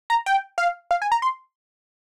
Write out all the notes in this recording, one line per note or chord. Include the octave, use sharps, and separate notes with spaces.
A#5
G5
F5
F5
G#5
A#5
C6